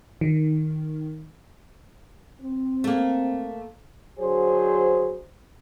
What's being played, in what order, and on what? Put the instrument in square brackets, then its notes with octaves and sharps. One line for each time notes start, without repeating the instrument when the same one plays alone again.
[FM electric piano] D#3
[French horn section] C4
[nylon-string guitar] A3 A#3
[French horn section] D3 F#3 G#4 C5